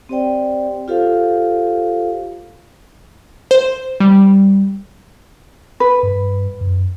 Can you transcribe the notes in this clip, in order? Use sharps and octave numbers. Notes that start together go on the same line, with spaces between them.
C4 G4 C5 D5 G5
F4 G4 A4 C5 F5
C5
G3
B4
G2
F#2